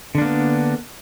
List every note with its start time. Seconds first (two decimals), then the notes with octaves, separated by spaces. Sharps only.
0.15 D3
0.18 D4
0.22 A#3
0.25 B3